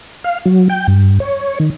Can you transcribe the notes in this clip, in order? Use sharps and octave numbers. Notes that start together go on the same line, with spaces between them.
F5
F#3
G5
G2
C#5
D#3